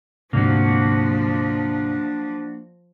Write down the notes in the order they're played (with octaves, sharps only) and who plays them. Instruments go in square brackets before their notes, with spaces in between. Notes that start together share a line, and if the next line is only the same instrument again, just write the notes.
[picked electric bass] D2 G#2 C3 [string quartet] F3 [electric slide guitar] A#3 F#4 [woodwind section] D4